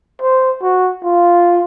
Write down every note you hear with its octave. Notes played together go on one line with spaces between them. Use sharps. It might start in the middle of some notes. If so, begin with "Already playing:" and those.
C5
F#4
F4